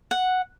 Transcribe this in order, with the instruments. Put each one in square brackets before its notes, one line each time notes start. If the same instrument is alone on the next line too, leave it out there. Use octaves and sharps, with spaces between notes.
[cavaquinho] F#5